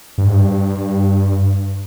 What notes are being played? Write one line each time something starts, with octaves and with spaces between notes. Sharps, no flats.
G2
G#2
G2